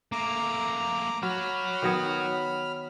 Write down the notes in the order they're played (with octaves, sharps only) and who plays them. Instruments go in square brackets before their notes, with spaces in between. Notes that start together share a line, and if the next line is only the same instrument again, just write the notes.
[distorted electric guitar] A3 A#3 [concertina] A#5 D6
[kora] F#3 [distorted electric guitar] F#4 C#5 [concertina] B5 F6
[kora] D#3 F#3 B3